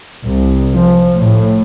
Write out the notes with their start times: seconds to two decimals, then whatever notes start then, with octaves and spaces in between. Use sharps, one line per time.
0.23 C2
0.76 F3
1.15 A2